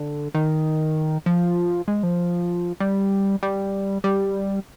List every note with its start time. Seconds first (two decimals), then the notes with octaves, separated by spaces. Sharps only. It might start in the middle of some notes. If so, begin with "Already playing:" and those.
Already playing: D3
0.35 D#3
1.26 F3
1.88 G#3
2.03 F3
2.80 G3
3.43 G3
4.04 G3